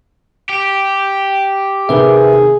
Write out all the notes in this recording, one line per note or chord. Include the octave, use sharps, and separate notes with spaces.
G4
C3 D#3 G#4 A#4 B4 E5